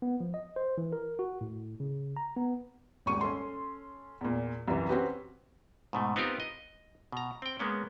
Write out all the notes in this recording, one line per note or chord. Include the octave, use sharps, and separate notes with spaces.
B3
F3
D#5
C5
E3
A#4
F#4
A2
C#3
A#5
B3
D#1 G#1 C#6 D#7
C#4 A4 C6
E2 A#2
C2 F#2 E3
C4 C#4 F#4 G4 B4
G#2 B2 A3
B3 C4 D#4 F4 G4 A#4
D#5
B2 A#5
C4 G5
G#3 A#3 B3 C#4